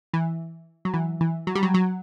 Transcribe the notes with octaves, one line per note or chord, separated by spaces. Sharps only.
E3
F#3
E3
E3
F#3
G3
F#3
F#3